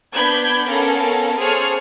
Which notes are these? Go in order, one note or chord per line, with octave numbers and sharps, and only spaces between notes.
B3 D4 B5 G6 G#6
B3 C#4 A4 A#4 F5
G#4 A4 C5 C#5 C#6 F6